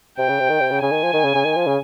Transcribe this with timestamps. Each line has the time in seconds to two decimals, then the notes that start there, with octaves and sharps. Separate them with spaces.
0.18 C3 G5
0.29 C#3
0.40 C3
0.50 D#3
0.60 C3
0.71 C#3
0.82 C#3 G#5
0.92 D#3
1.03 F3
1.13 D#3
1.24 C#3
1.35 C#3
1.45 D#3
1.56 F3
1.67 C#3